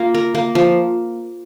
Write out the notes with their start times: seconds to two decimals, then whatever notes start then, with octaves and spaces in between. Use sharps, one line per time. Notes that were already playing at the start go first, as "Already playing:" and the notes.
Already playing: A#3 F4
0.14 A#4
0.35 A#3
0.55 F3